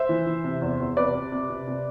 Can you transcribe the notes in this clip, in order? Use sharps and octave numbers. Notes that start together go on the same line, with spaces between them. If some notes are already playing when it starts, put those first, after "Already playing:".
Already playing: C5 E5
E3
E3
C3
E2
E2
C3 B4 D5
C3
C3
C3
C3